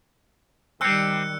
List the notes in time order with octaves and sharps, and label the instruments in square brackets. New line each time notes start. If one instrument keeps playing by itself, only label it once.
[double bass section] D#3 G3 [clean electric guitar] C4 G4 [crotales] E6 F#6 C#7